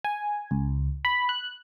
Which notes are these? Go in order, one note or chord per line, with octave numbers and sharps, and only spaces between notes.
G#5
C#2
B5
F#6